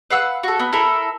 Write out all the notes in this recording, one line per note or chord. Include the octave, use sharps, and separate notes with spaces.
B4 F5 F#5 E6
F#4 A4
B3
E4 A4 A#4